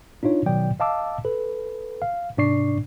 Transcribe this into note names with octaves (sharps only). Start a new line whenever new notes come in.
D4 D#4 F4 C#5
B2 D#3 F#3 D5 G5
D#5 F5 A5 D6 E6
A4 B4
F5
G#2 C3 D4 D5 C#6 C7